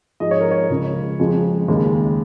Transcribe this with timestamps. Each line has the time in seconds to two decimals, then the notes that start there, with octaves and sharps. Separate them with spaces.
0.20 G#2 F3 G#3 D#5
0.31 C#5
0.40 A#4
0.51 C#5
0.70 C#2 C#3 F3 G#3
1.19 F2 C#3 F3 G#3
1.68 D#2 C#3 G#3